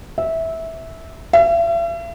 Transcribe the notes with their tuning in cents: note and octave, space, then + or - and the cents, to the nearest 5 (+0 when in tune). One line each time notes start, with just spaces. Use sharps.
E5 -15
E5 +40